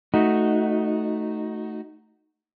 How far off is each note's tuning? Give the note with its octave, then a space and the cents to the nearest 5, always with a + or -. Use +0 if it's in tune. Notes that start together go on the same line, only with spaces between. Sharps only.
A3 +0 D#4 +0 F#4 +0